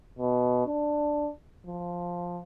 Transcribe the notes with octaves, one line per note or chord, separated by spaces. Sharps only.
B2
D4
F3